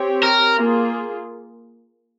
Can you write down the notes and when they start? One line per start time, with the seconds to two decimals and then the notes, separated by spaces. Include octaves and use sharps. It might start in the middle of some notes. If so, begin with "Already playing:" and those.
Already playing: C4 G4 C#5
0.23 A#4
0.57 A#3 F4 G#4